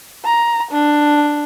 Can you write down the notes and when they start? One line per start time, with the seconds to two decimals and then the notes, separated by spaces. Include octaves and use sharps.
0.24 A#5
0.72 D4